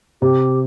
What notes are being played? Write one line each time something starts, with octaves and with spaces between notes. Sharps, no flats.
C3 G4